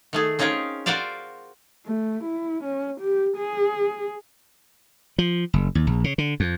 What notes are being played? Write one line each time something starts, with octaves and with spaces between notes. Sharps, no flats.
D#3 A3 G#4
C4 C#4 D#4 F4 G#4 A#4
F4 F#4 A#4 C5 D5 F5
A3
E4
C#4
G4
G#4
F3
F#1
D#2
A#1
C#3
D3
F2